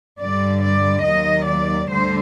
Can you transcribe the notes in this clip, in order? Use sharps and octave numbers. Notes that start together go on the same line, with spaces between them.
G2 D3 G3 D5
D5
D#2 D#3 F#3 D#5
D5
D2 D3 G3 C5